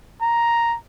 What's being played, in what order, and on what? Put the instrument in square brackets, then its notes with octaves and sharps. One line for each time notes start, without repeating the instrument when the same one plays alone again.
[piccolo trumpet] A#5